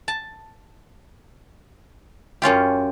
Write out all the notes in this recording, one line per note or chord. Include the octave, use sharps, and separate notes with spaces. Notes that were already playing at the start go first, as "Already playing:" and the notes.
A5
F#2 C#4 F4 G4